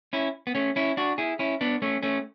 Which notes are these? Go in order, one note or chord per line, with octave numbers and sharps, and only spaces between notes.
C#4 E4
B3
A3 C#4
C#4 E4
D4 F#4
E4 G#4
C#4 E4
B3 D4
A3 C#4
A3 C#4